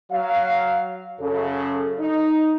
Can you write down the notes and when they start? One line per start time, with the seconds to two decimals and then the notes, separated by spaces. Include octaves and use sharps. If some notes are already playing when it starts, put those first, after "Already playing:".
0.11 F#3 F5
1.19 F#2 C#3 A4
1.99 D#4